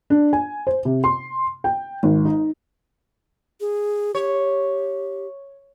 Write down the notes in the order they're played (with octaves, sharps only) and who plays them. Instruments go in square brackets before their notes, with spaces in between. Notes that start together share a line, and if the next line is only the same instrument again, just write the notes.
[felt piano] D4
G#5
C5
C3
C6
G5
G#1
D#4
[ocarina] G#4
[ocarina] G4 [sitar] C#5